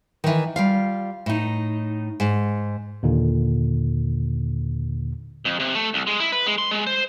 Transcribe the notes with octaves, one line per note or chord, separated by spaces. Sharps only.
D#3 E3
G3 F4 F5
A2 D#4
G#2
D#2 A#2 D3
F2
C3
A3
C2
G#3
E4
B4
G#3
C6
G#3
C5